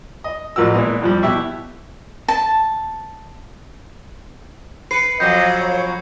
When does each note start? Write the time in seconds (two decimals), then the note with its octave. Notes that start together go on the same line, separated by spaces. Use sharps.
0.24 D#5
0.56 A1 F3 F#4 A#4 E6
0.74 A#2 E3 G#3 B3
1.02 F2 F3 G3
1.23 B2 E4 G4 E5 C#6
2.28 A5
4.91 B4 C7 C#7
5.20 F2 F#3 D#5 G6
5.60 C#5